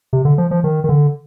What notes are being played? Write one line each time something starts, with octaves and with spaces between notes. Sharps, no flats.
C3
D3
F3
F3
D#3
D#3
D3